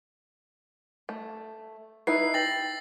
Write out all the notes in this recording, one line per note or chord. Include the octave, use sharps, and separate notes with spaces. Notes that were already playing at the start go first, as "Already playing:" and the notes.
A3
D#4 E4 B4 E6 C7
G4 A6 A#6 F#7